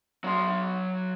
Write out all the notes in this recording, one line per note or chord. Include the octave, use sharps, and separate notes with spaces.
F#3 C6